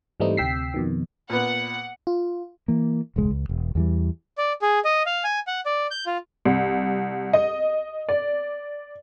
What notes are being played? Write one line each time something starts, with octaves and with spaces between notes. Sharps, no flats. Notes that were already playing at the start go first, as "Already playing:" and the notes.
G#2 E3 G3 A3 C4 D#4
D2 C3 G5 E6 B6 C7
F2 B2 D#3
A#2 B3 F#5
F4
E3 A#3
E1 C#2 G#3
C#2
E1
E2 E3 G3
D5
G#4
D#5
F5
G#5
F#5
D5
G6
F4
C2
D#5
D5